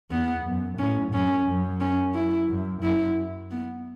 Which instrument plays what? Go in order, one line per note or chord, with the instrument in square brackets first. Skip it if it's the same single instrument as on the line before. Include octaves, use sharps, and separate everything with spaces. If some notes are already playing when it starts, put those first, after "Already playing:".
[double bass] E2 [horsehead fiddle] B3
[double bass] F#2
[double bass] A2 [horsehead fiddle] C#4
[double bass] F#2 [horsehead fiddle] C#4
[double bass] F#2
[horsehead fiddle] C#4
E4
[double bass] F#2
[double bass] F#2 [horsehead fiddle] E4
[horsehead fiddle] B3